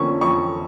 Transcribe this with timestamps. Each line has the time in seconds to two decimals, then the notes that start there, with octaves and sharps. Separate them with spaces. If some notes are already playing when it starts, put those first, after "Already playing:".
Already playing: F2 D3 F3 A#3 C#4 C#6
0.21 F2 C#6